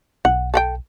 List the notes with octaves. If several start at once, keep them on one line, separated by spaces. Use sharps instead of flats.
B1 F#5
A4 F#5 G5